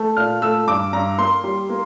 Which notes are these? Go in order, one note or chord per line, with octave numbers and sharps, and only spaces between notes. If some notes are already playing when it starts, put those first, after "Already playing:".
Already playing: A3
A#2 F6
A3 E6
G2 D6
G2 A#5
A#3 C6
G3
A#3